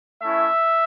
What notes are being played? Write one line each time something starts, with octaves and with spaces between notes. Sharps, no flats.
A3 C#4 E4 E5